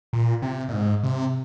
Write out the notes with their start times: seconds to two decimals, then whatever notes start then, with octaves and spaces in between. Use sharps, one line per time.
0.13 A#2
0.42 C3
0.69 A#2
0.73 G#2
1.03 C3